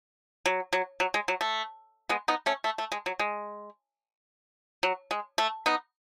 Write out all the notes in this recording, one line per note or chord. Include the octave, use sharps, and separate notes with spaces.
F#3
F#3
F#3
G#3
F#3
A3
G#3 B3
B3 D#4
A3 C#4
A3
A3
G#3
F#3
G#3
F#3
G#3
A3
B3 D#4